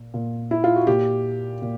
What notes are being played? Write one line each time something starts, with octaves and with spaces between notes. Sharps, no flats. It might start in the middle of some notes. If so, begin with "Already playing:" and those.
Already playing: A#2
A#2
E4
F4
F#4
A#2 G4
A#2